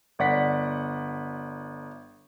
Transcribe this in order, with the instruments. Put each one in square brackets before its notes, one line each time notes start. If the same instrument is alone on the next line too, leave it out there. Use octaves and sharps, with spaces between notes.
[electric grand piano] G1 D5 F#5 B6